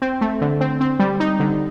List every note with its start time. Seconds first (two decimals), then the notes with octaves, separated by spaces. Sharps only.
0.02 C4
0.21 A3
0.41 D3
0.61 C4
0.81 C4
0.99 G3
1.20 D#4
1.40 D3